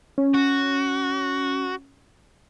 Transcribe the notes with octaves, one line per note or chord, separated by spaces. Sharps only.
C#4
F#4